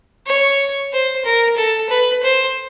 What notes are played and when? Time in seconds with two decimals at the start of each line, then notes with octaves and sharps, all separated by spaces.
0.27 C#5
0.92 C5
1.25 A#4
1.57 A4
1.90 B4
2.23 C5